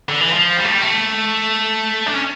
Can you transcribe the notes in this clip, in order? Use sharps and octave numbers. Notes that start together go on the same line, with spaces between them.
D3
E3
F3
G3
A3
G3
A3
D4
C#4